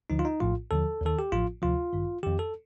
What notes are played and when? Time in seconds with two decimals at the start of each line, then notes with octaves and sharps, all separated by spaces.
0.10 D2 D3 F3 D#4
0.19 F4
0.25 D#4
0.40 A#1 A2 F3 F4
0.71 D#2 D3 F3 A4
1.02 D#2 D#3 A4
1.19 G4
1.32 A1 A2 F3 F4
1.62 D2 C3 F3 F4
1.93 A1 G2 D#3
2.23 F2 D#3 G4
2.39 A4